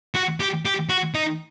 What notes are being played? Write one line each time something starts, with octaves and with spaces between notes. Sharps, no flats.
F#4
G4
G4
F#4
D#4